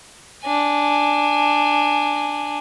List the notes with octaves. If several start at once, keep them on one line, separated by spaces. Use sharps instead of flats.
D4 G#5